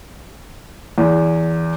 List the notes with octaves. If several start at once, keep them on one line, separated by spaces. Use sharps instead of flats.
E2